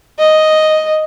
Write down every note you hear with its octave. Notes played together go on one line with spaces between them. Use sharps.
D#5